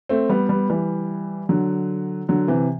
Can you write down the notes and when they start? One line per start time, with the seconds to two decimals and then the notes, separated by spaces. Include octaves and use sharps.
0.09 A3 C4
0.29 G3 B3
0.49 G3 B3
0.70 E3 G3
1.49 D3 F#3
2.29 D3 F#3
2.48 C3 E3